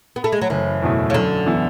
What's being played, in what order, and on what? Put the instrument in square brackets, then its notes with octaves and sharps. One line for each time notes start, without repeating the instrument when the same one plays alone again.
[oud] B3
A3
G#3
F#3
[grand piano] F#1 [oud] E3
[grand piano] E2 B2 A3 E4
[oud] C#3
[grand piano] F#2 [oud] D3
[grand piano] E3 B3 E4